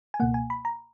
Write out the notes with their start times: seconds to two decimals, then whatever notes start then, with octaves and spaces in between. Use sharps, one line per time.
0.14 G#5
0.20 C#2 B2 A#3 F#5
0.34 G#5
0.50 B5
0.65 A#5